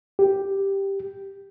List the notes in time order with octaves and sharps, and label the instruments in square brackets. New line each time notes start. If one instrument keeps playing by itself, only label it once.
[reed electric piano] G4